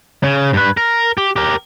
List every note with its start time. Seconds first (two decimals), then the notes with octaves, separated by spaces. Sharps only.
0.23 C#3
0.53 G2 B4
0.77 A#4
1.18 G4
1.36 G4 A#4